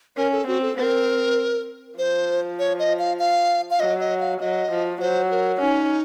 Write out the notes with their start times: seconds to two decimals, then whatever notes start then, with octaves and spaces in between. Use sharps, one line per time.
0.17 C#4 A#4
0.32 A4
0.47 C4 F#4
0.62 A4
0.77 C4 A#4 C5
1.98 F3 C5
2.59 C#5
2.79 D#5
2.99 F5
3.19 F5
3.71 F5
3.79 F#3 D#5
4.00 D#5
4.20 F5
4.40 F#3 D#5
4.71 F3
5.01 F#3 C5
5.31 A#4
5.61 C#4 D#4